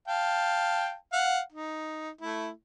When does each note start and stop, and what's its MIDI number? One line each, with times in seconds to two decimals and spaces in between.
0.08 0.93 77
0.08 0.93 79
0.08 0.93 81
1.13 1.40 77
1.13 1.40 78
1.53 2.10 63
2.21 2.50 57
2.21 2.50 64